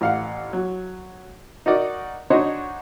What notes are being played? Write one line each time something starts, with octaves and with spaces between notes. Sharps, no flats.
A1 F5 F#5
F#3
D#4 F#4 A#4 D5 D#5
D4 D#4 F#4 C5 C#5 D#5